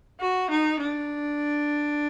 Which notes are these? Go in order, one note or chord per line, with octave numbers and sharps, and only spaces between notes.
F#4
D#4
D4